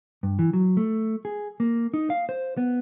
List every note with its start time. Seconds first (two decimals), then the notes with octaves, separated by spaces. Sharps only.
0.23 G2
0.39 E3
0.53 F#3
0.77 A3
1.25 G#4
1.60 A#3
1.94 D#4
2.10 F5
2.29 C5
2.57 B3